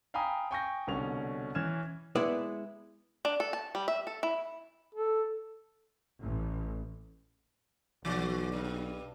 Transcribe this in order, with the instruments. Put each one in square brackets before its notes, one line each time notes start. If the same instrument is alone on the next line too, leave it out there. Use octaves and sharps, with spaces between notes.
[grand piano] F5 G5 G#5 A#5 B5 D#6
G5 G#5 C#6 D#6 G6 A#6
C2 B2 D3 C#4 C#6 F7
E3 C#4 F6 G#6 E7
[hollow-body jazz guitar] G#3 B3 E4 B4 D5
[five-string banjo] D4
A4
A5
G3
E5
A4
E4
[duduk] A4
[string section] A1
[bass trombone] B1 [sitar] E3 F#4 D5
[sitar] G2 B2